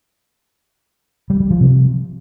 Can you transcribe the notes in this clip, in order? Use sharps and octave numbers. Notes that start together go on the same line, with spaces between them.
G3
G3
F3
C3